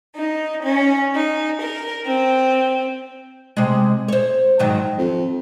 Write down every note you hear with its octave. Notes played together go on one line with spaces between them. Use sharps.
D#4
C#4
D#4
A#4
C4
C3 G#3
C5 C#5
G#2 D#3 F#3
F2